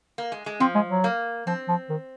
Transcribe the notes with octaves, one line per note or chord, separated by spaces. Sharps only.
A#3
G#3
G#3
F3 C4
G#3
F#3
A#3
F3 C4
F3
D#3